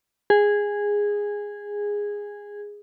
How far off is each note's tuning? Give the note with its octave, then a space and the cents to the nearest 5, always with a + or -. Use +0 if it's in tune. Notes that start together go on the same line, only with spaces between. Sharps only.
G#4 -10